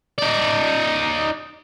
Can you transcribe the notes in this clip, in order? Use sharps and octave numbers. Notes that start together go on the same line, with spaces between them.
D#4 D5